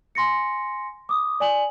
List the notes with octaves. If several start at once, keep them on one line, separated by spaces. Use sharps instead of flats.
G#5 C6 A#6 C#7
D6 D#6
D5 G#5 F#7